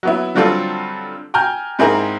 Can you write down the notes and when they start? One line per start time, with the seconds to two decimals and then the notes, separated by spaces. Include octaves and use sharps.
0.03 F#3 B3 E4
0.35 D3 F#3 G3 C4 F4 A4
1.34 G5 G#5 A#5 F6 G6
1.79 G#2 C4 E4 G#4 A#4